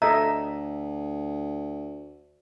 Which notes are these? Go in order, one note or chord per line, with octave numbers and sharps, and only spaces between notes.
D2 A4 D#5 E5 A#5